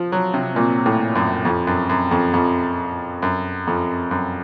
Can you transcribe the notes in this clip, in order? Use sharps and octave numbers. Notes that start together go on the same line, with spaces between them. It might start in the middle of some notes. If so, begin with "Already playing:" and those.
Already playing: F3
F#3
C3
A#2
A2
F#2
F2
F#2
F#2
F2
F2
F#2
F2
F#2